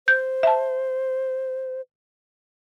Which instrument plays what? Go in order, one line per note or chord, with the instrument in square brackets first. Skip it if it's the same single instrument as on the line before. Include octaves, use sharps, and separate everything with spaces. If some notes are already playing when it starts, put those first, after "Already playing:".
[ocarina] C5 [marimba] G6
[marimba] E5 A5